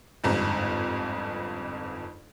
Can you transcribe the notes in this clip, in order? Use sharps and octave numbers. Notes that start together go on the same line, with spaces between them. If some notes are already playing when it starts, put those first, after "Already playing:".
G1 F2 G#2